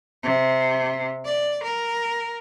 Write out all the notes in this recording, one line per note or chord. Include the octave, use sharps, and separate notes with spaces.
C3
D5
A#4